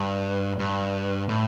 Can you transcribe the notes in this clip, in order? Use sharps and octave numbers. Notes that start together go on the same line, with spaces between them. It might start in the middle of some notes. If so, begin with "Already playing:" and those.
Already playing: G2
G2
A2